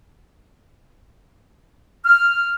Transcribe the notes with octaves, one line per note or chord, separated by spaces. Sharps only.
F6